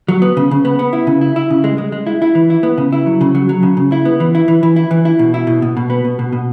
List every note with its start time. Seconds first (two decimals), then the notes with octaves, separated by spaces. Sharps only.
0.08 F#3
0.22 B3
0.37 C#3
0.51 C#3
0.65 B3
0.79 B3
0.93 E4
1.07 C#3
1.21 E4
1.36 E4
1.50 C#3
1.64 G#3
1.78 G#3
1.92 G#3
2.07 E4
2.22 E4
2.35 E3
2.50 E4
2.63 B3
2.78 C#3
2.93 E4
3.06 F#3
3.21 C#3
3.35 F#3
3.49 F#3
3.63 C#3
3.77 C#3
3.92 E4
4.05 B3
4.20 E3
4.35 E4
4.48 E3
4.63 E3
4.76 E4
4.91 E3
5.05 E4
5.19 B2
5.34 E4
5.47 B2
5.62 B2
5.77 B2
5.90 B3
6.05 B2
6.19 B2
6.33 B2